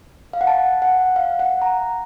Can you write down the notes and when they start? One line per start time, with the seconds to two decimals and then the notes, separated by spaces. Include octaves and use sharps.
0.33 F5
0.41 F#5
0.47 A5
0.82 F#5
1.16 F5
1.39 F#5
1.62 A#5